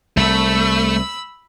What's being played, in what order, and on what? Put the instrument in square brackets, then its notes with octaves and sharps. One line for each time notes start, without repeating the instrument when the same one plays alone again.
[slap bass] C2 [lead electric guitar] A3 [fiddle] B5 E6